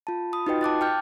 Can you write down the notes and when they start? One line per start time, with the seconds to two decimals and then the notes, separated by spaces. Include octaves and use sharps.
0.07 F4 A5
0.33 B5 D#6
0.47 D#4 F4 F#4 B4 D#5 G5
0.61 A5 D6 F#6 A6
0.81 G5 F6 G6